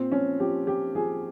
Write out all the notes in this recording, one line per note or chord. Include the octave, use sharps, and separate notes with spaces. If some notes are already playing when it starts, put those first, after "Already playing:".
Already playing: A#2 C4
F3 C#4
F3 G4
F3 G4
F3 G#4